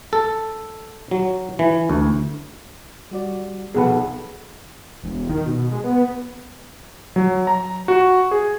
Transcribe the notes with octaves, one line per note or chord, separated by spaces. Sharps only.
A4
F#3
E3
D2
G3 F#4 D5
B1 C3 F3 G#4 A4 B4 F#5
E1
D#3
B2
G#3
B3
F#3
A#5
F#4
G#4